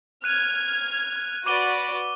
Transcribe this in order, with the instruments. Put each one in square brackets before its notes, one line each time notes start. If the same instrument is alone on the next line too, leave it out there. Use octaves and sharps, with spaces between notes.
[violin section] F6 G#6 [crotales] F#6 D#7
[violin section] F#4 B4 D5 [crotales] D6 D#7 G7